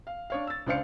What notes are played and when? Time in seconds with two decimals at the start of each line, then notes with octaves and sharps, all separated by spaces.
0.07 F5
0.30 D4 C#5 F5
0.47 E6 A6
0.66 C#2 D4 C5 F5 C#7